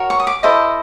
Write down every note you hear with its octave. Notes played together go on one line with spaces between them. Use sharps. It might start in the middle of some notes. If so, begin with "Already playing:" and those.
Already playing: F#4 A#4 C#5
C#6
D#6
D6
E4 A4 C5 D#5